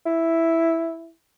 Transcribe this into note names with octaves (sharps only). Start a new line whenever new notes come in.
E4